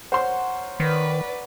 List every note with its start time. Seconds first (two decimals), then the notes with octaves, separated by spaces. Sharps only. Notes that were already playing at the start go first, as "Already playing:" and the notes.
0.12 A#4 C5 C#5 F#5 C6
0.80 D#3 B4 D5